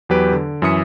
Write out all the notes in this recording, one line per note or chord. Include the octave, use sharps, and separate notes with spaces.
E2 F#3 G4 B4 D7
D3
F#2 E3 E5 D#6 C#7